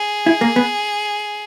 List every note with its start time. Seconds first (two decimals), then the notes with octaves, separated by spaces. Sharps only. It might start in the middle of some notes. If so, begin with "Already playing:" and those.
Already playing: G#4
0.26 E4
0.41 A#3
0.56 B3